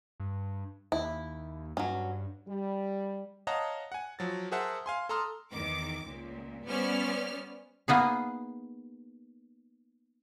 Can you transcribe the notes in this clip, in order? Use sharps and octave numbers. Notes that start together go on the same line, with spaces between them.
G2
D#2 E4
G2 F#3 C#4
G3
C#5 D#5 F5 F#5 A5 A#5
F#5 G#5
F3 F#3 A6
G#4 A#4 C5 E5 F#5 A5
F5 G#5 C6
A4 A5 A#5 C6 D#6 F6
E2 D#3 D6
C#2 A#2
G3 B3 C#4 C5 D5 F6
A#3 B3 D#4 G#4